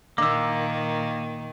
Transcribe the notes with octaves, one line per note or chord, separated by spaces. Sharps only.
A#2 D#3 A#3 D6 E6